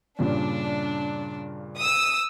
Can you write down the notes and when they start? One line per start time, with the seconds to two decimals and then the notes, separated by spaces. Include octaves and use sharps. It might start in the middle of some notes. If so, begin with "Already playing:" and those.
0.19 G2 A#2 C#3 D4
1.77 D#6 E6